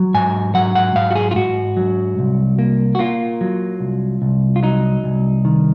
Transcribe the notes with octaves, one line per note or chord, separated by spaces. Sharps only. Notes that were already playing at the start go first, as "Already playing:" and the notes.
Already playing: F#3
G#2 G#5
F#3 F#5
F#5
G#2 F5
F#4
G#4
F4
G#2 F#4
F#3
C2
A#3
F#4
A#3 F4
F#3
C2
C2
F4
F#3 D#4
C2
D#3